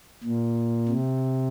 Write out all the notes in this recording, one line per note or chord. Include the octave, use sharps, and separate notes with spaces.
A#2
C3